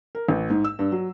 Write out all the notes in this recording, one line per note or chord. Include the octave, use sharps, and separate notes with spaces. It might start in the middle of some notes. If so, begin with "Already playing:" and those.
A#4
A1
G#2
E6
G2
F#3